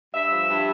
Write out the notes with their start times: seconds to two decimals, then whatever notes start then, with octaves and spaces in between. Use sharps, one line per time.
0.14 G2 E5
0.31 F3
0.48 G2